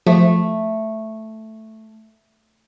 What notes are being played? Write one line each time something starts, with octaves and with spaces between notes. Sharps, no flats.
F3 A3